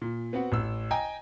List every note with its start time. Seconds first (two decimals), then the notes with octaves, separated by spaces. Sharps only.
0.01 A#2
0.33 B3 C4 F#4 F#5
0.52 A1 E6
0.91 D#5 G5 G#5 A#5